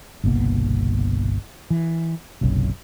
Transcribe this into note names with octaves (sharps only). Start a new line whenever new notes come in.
G1 C2 B2 A#3
E3
F#1 B1 F#2 C3